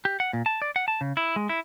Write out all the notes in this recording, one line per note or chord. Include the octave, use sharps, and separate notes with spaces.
G4
F#5
A#2
A5
D5
F#5
A5
C#3
E4
G#3
E4